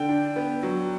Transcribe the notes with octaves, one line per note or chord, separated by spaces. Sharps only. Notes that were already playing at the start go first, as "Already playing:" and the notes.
Already playing: D3 G5
D4
B3
F#3